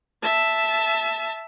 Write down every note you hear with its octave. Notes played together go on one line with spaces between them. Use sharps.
E5 A5